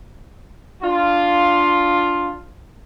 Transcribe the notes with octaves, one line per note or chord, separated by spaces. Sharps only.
D4 F4